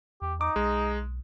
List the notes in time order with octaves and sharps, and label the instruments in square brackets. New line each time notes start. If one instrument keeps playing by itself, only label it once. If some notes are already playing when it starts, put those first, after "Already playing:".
[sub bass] E2 [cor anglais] G4
[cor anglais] D#4 [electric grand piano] D6
[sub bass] B1 [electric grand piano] G#3